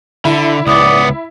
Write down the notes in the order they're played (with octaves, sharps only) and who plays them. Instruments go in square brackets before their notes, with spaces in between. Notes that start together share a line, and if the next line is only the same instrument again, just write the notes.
[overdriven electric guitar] D3 [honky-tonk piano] E4
[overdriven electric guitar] C#2 B3 [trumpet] D5 [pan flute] D#6